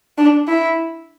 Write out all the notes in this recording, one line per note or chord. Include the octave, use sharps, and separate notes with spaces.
D4
E4